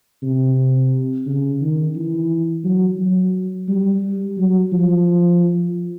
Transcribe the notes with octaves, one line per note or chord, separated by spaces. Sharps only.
C3
C#3
D#3
E3
F#3
F#3
G3
F#3
F3